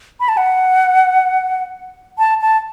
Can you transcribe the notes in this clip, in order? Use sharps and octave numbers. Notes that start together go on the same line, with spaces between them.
B5
A5
F#5
A5
A5